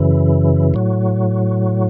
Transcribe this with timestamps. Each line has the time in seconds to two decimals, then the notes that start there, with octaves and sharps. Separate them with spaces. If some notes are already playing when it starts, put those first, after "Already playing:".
Already playing: F#2 C#3 E3
0.74 A2 F#3